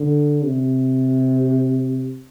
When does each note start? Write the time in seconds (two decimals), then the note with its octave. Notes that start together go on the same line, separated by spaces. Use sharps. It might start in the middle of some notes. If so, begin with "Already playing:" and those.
Already playing: D3
0.44 C3